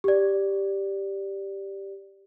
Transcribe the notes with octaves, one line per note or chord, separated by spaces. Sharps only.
G4 D5